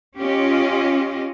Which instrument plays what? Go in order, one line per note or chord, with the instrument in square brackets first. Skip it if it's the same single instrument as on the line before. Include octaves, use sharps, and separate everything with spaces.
[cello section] C#4 F4 G4 D#5